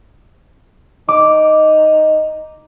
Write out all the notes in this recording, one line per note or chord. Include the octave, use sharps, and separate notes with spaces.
D#4 D6